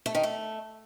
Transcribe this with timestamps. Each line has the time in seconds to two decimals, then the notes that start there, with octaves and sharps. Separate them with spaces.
0.06 A3
0.15 D#3
0.23 A3